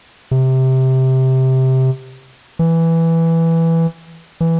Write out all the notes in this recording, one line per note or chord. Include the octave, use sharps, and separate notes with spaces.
C3
E3
E3